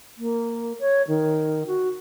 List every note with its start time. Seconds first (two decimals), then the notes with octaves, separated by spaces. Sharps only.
0.18 A#3
0.79 C#5
1.08 D#3
1.67 F#4